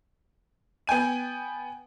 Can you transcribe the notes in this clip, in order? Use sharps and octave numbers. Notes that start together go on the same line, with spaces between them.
B3 G5 G#5 D#7